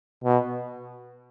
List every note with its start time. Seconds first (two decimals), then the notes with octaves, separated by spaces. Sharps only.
0.24 B2